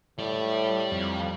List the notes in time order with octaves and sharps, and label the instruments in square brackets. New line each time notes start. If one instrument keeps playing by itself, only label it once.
[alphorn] A2 [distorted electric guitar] G3 D5
[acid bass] F2